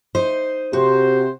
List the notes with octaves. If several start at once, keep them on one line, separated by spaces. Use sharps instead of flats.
D#4 C5
C3 F#4 C5